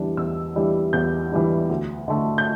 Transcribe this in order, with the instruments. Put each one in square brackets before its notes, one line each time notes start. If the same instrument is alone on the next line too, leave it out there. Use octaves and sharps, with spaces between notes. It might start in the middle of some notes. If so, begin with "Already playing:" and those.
Already playing: [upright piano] E2 E3 G3 D4
E2 E6
E3 G3 D4
E2 G6
E3 G3 D4
D2
D3 A3
G6